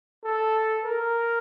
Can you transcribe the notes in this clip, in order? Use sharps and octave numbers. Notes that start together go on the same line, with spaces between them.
A4
A#4